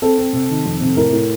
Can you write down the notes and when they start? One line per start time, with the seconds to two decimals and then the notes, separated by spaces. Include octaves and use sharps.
0.02 C4 A4
0.18 C4
0.33 C3
0.50 D#3
0.66 F2
0.81 C3
0.97 A2 A#4
1.13 A2